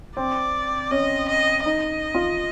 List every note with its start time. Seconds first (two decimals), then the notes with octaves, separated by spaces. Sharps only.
0.17 C4 D5
0.91 C#4 D#5
1.29 D#5
1.65 D#4 D#5
2.15 F4